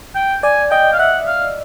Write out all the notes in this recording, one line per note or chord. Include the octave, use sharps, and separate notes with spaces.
G5
D5 G#5
D#5 G5
F5
E5 F#5
F5